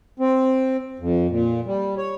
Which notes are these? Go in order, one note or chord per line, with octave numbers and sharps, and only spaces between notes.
C4
F2
A#2
G3
C#5